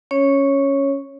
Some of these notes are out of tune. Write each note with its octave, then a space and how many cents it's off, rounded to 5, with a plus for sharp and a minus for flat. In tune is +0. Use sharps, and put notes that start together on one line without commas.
C#4 +0 C#5 -10